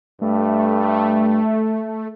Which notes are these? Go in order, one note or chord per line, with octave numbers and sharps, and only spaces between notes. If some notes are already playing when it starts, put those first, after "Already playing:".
G2 A3